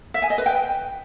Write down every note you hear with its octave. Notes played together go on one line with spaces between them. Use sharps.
E5
G#5
D#5
B4
G5